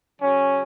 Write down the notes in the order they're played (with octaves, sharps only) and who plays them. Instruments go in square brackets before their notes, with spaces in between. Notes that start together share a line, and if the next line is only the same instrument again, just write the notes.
[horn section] C#3 F#3 C#4